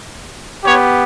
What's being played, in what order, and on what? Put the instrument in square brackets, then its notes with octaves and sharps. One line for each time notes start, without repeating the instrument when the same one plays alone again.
[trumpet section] B3 G4 C#5